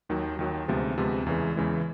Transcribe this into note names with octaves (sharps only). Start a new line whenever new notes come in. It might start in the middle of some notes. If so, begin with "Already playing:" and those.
D#2 D#3 F#3
D#2 D#3 F#3
D2 C3 F3 G#3 B3
D2 C3 F3 G#3 B3
E2 C#3 E3 G#3
E2 C#3 E3 G#3